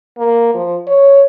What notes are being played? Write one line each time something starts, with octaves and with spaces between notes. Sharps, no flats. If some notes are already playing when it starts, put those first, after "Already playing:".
A#3
F3
C#5